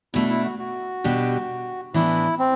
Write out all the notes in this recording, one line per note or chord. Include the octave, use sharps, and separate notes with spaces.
B2 A3 D4 E4
E4
F#4
F#4
B2 G3 D4 G4
A2 E3 B3 D4 E4
C4